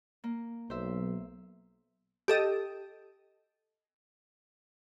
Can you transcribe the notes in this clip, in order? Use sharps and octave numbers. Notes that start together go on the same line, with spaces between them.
A#3
B1 C5 E5
G4 A4 D#5